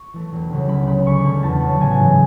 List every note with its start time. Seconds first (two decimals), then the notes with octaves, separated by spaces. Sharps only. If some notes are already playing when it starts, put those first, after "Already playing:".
Already playing: C#6
0.13 E3 A3
0.32 E1
0.50 D2 C#3 F#3
0.69 C#2 B5
0.87 C#3 G#3 B5
1.06 D2 C#6
1.24 D3 A3 B5
1.43 E2 A5
1.62 C#3 F#3
1.80 A1 G#5
1.99 G#2 E3